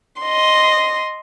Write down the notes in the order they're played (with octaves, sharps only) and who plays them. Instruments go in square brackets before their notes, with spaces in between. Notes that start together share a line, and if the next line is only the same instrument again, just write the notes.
[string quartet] D#5 C6